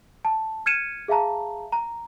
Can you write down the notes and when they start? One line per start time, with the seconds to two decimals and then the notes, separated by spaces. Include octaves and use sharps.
0.25 A5
0.66 F6 G#6 C#7 D#7 E7
1.08 G#4 E5 F5 A5 A#5
1.72 A#5